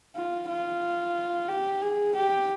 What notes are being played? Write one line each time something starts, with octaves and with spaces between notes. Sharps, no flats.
F4
F4
G4
G#4
G4